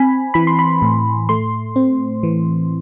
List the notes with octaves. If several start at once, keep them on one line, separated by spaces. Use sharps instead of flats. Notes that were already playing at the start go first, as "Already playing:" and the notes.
Already playing: C4 G#5 B5
E3 B5
C6
B5
A2
A3 C6
C4
E3